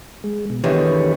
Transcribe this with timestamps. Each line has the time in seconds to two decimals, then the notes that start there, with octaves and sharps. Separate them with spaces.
0.24 G#3
0.50 B2
0.64 E2 D3 D#3 G4 B4 C#5